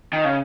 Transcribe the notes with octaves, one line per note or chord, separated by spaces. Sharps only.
D#3
C#3